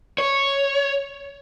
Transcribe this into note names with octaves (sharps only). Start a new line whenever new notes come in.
C#5